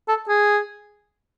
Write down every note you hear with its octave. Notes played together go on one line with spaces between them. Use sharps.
A4
G#4